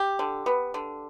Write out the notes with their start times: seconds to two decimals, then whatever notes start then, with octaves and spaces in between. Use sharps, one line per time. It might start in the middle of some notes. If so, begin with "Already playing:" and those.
Already playing: G4
0.19 D3
0.46 B3
0.74 D3